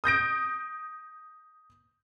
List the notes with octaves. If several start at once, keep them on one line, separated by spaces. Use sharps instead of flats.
D#6 G6 A#6 D7